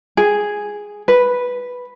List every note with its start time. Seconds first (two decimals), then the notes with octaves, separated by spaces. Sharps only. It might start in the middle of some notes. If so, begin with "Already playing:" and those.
0.17 G#4
1.08 B4